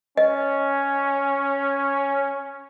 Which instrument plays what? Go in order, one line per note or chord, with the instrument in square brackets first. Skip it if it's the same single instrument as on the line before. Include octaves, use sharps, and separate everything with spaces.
[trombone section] C#4 [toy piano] D#5